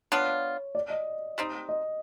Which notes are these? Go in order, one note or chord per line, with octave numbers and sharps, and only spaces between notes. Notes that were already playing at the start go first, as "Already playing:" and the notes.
B3 D4 F4 C#5
D5
D#5
G3 C4 D#4
D#5